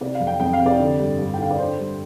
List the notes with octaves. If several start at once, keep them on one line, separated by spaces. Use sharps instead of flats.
C3 D5
F5
F2
G5
F2 G5
F5
C3
D5
D3
G2
G2
G5
D3 F5
D5
D3 C5
G2